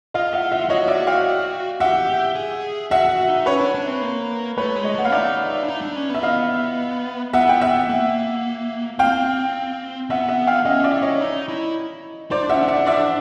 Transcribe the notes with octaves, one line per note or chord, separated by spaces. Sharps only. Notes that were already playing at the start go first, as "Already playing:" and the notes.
F4 D#5 F5
E5 F#5
E5 F#5
F#4 C#5 D#5
D5 E5
F5 G5
G4 E5 F#5
G#4
F#4 E5 F#5
F#4
D#4
C#4 B4 C#5
D4
D4
C4
A#3
A3 B4 C#5
G#3
C#5 D#5
A3 F#5
F5
D#4 D5 E5
D4
D#4
D4
C#4
B3 E5
D#5 F5
B3 E5 F#5
G5
E5 F#5
A#3
C4 F5 G5
B3 E5 F#5
E5 F#5
F5 G5
C#4 D#5 F5
D5 E5
C#4
C#5 D#5
D#4
E4
D#4 C5 D5
D4
C#4 E5 F#5
D4
E5 F#5
D5 E5